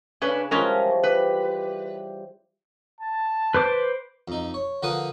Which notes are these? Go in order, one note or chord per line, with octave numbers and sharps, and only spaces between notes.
C#3 C#4 D4 B4
E3 F3 G3 G#3 C#4 A#4
G4 B4
A5
B4 C5 D6
F2 D#4
C#5
D3 F3 A#4 B4 F#5 D#6